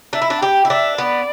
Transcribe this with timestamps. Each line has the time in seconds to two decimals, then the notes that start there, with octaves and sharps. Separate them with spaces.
0.13 D4 E5
0.22 E4
0.30 D4
0.41 G4 G5
0.65 E4
0.70 D4 E5
0.98 B3 D5